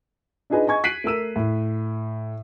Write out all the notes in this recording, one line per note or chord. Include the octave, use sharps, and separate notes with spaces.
D4 D#4 F4 G#4 B4 D#5
D#5 G#5 C#6 G#6
F#6 B6 C7 D7 D#7 F#7
A3 A#4 E6 D#7
A2